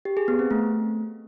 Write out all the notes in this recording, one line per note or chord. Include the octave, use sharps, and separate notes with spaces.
G4
G#4
B3
C4
A3